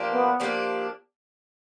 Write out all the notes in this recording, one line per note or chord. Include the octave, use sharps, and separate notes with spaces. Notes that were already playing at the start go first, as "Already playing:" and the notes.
Already playing: F3 A#3 D4 G4
B3
F3 A#3 D4 G4